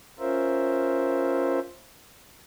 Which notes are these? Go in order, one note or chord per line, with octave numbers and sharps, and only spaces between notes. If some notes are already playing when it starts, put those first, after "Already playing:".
C#4 F4 A#4 C5 E5